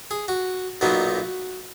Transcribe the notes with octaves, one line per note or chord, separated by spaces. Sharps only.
G#4
F#4
B1 A#2 F#3 B3 D#4 F#4